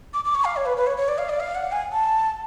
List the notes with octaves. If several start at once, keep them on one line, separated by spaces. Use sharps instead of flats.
D6
D6
C#6
F5
C#5
B4
B4
C#5
C#5
D5
F5
D5
F5
F#5
G#5
A5